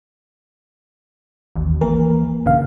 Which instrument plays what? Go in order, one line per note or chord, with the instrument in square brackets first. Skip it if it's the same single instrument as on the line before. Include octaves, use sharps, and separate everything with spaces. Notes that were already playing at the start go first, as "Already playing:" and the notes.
[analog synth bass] A1 [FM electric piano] D#2
[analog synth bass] E3 [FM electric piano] A#3 A#4
[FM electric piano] A#1 C#3 F5 [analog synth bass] G2